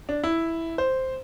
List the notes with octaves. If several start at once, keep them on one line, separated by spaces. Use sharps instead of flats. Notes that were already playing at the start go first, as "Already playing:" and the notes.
D4
E4
C5